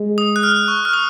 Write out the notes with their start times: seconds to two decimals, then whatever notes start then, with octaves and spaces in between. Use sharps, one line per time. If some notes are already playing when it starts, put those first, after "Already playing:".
Already playing: G#3
0.18 D#6
0.36 F#6
0.43 F6
0.68 C#6
0.85 F6
0.93 D#6